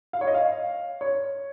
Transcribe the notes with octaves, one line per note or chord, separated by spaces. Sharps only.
F5
C#5
D#5
F5
C#5